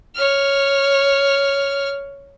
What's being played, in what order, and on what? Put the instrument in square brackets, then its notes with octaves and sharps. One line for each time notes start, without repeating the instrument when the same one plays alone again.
[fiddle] C#5 F6